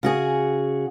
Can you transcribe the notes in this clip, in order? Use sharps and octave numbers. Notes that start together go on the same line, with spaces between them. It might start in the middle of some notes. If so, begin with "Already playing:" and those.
C#3 F#4 G#4